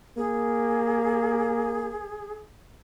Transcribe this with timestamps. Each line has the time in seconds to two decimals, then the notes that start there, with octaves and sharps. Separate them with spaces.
0.18 A#3 G#4